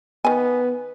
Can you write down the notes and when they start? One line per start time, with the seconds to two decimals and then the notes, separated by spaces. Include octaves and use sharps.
0.25 D#3 B3 G#5